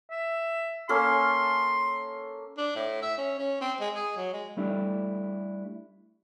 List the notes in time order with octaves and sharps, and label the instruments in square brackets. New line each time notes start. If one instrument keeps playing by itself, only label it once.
[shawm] E5
[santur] A#3 C#4 A4 [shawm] C6
[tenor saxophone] D4
A2
E5
C#4
C#4
C4
G#3
G#4
F#3
G#3
[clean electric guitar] G3 A3 D4 E4